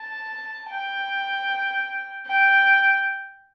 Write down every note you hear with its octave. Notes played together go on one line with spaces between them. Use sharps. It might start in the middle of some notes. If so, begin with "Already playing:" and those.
Already playing: A5
G5
G5